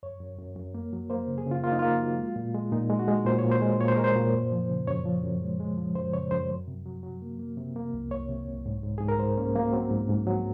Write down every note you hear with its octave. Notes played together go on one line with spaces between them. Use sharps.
F#2 C#5
F#2
F#2
F#2
A#3
F#3
A#3 C5
C#3
G#4
C#3 F4
A#3 F4
D#4
A#3 F4
F#3
G#3
A#2
G#3
A#2 D#4
G#3
F#4
G#3
A#2 C5
A#2 C#5
C5
G#3
A#2 C#5
C5
G#3 A#4
C5
A#2
F#2
F3
C#3
F#2 C#5
F3
F#2
G#3
G#3
F3
F#2 C5
C#3 C#5
F#2 C5
F#3
C3
F#3
F#3
A#3
A#3
C3
A#3
C2
C2 C#5
C3
C2
G#2
G#2
G#2 G#4
A#4
G#2 C5
A#3 C#4
F#3 A#3
F#3 C4
G#2
G#2
F#3